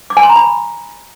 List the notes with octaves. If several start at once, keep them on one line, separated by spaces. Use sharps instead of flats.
D6
G#5
C6
A#5
B5